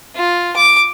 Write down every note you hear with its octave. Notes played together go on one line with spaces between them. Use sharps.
F4
D6